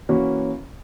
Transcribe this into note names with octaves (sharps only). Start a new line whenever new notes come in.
E3 A#3 C#4 F#4